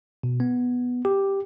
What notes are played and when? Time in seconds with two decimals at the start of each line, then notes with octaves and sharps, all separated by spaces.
0.23 B2
0.40 B3
1.05 G4